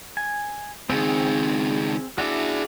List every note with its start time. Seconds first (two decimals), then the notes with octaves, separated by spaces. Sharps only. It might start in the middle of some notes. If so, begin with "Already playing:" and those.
0.17 G#5
0.90 C#2 D#3 C4 G#4
2.18 D4 E4 F#4 G#4 D5